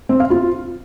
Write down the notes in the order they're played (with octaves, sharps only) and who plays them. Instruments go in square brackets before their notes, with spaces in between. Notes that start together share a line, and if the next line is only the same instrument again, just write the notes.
[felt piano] C4
F5
F4